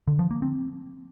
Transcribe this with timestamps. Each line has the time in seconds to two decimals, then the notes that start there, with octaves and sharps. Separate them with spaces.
0.07 D3
0.19 F3
0.31 A#3
0.42 C4